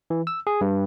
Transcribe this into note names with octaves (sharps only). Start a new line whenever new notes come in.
E3
E6
G#4
G2